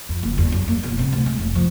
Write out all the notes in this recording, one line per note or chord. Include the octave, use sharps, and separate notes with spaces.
F2
F#1
E2
F#2
A#3
E1
C3
D2
G#3
F1
F3